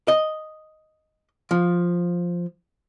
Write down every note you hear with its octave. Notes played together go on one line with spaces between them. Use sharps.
D#5
F3